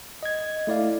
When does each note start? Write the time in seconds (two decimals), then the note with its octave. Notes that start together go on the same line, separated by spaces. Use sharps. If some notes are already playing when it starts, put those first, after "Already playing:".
0.23 D#5 G#6
0.67 A3 E4 D5 F5